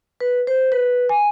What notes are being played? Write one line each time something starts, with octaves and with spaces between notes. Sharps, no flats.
B4
C5
B4
G#5